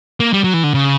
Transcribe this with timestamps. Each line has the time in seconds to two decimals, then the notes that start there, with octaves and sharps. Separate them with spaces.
0.20 A#3
0.33 G3
0.44 F#3
0.54 E3
0.64 D3
0.74 C#3